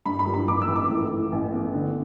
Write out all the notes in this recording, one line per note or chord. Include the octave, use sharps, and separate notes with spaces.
G2 B5
B5
G3
B5
A1 D6
E6
A1
D6
A2
E3
A1
B3
D3